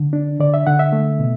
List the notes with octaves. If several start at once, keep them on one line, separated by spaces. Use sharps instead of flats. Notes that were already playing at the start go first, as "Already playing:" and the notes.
Already playing: D3
D4
D3 D5
E5
D3 F#5
E5
A3
B2